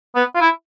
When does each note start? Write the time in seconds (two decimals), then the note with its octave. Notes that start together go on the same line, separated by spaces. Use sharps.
0.15 B3
0.35 F4
0.41 E4